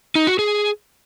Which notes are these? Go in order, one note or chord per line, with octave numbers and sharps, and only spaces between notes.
D#4
F#4
G#4